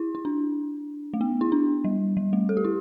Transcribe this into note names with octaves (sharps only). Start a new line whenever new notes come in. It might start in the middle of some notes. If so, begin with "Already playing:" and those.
Already playing: E4
E4
D4
A3
B3
E4
D4
G3
G3
A3
A4
G4
E4